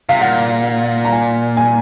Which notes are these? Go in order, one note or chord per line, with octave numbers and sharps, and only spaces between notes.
C3 F5
A#2 F#5
A#5
G#5
G#5